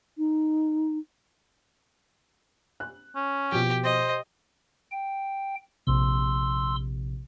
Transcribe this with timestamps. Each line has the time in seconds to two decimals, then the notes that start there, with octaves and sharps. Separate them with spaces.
0.18 D#4
2.80 F#6
3.16 C#4
3.52 B2 F3 G4
3.85 C5 D#5
4.91 G5
5.87 A#1 C3 C6 E6